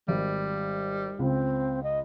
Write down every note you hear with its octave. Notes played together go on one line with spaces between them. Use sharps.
G#1 G3
C#2 C4
D#5